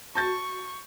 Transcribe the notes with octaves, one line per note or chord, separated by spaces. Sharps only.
F#4 A5 C#6 G6 A6